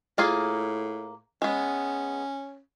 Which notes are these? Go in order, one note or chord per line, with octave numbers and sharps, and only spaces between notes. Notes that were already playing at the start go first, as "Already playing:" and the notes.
A2 A#3 F4 G#4
G#3 B3 C#4